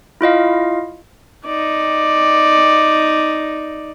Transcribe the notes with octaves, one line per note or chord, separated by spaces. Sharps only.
E4 F4 D#5 F5
D#4 D5